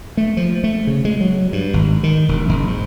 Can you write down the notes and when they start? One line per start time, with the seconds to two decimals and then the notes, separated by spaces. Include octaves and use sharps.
0.17 A3
0.37 F3
0.64 A3
0.87 C#3
1.05 G#3
1.21 F#3
1.52 G2
1.74 G#1
2.03 D#3
2.28 E1
2.49 F#1
2.67 G#2